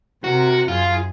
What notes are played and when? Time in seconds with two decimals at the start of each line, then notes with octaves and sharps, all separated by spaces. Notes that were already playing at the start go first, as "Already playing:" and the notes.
0.24 C3 F#4 A#4
0.68 F#2 F4 G#4